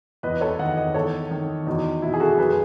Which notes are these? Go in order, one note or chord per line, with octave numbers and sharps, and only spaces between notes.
E2 B4 D#5
A4 C#5
D#3 D#5 F#5
D#5 F#5
E2 A4 C#5
D#3
E2 D#4 F#4
B2 E4
G#4
F#4 A4
F#2 G#4 B4